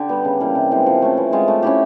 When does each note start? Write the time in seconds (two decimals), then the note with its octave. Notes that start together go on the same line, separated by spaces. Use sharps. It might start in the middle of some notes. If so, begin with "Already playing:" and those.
Already playing: D3 G4
0.09 G3 B3
0.25 C#3
0.40 E3 G3 A#3
0.55 C3
0.71 E3 G#3 C4
0.86 F3
1.02 A3 C#4
1.17 E3
1.32 G#3 C4 F4
1.48 A3
1.63 C#4 E4 G4